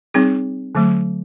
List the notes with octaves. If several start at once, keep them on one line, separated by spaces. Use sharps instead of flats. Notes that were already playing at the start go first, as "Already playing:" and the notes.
G3 C4 D#4 G#4
D3 F#3 A3